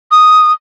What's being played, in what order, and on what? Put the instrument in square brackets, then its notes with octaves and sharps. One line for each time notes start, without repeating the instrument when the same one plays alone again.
[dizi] D#6